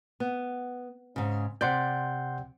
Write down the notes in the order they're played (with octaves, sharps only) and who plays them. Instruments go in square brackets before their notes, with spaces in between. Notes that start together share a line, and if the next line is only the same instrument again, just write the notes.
[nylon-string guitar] B3
G#2 C#3
[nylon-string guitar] C3 D5 [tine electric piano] F#5 C6 G6